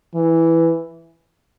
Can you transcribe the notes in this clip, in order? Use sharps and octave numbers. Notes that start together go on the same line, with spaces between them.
E3